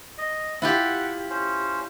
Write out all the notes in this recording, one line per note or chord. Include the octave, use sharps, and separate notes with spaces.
D#5
E4 F4 G4 F#5
C#4 C5